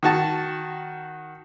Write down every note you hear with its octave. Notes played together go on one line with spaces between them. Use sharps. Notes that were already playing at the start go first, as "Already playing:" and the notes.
D#3 F#4 A5